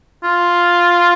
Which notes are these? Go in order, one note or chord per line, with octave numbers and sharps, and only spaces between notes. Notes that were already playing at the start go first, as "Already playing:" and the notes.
F4